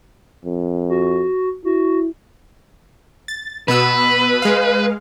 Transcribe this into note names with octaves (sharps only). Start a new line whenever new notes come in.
F2
F#4
E4 F#4
A6
B2 B3 B4 E6
G#3 F5